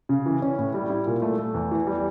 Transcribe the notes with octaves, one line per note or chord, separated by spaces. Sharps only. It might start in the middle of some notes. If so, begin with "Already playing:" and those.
C#3
E3
C#4
A2
G3
E4
A#2
A3
A3
E2
E3
G3